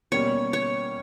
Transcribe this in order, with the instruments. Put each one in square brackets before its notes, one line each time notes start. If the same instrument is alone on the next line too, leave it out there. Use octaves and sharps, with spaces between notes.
[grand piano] B2 G3 A#3 C#4 [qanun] C#5
[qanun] C#5